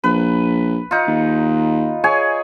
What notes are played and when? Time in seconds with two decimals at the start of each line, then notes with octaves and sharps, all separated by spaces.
0.04 A#1 B4
0.91 D#4 F4
1.07 D#2
2.04 G#4 C#5 G#5